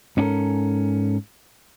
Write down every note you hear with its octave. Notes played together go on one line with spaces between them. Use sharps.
G#2 C#4 D4 G4 A4 A#4